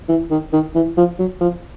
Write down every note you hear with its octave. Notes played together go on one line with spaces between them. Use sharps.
E3
D#3
D#3
E3
F3
F#3
F3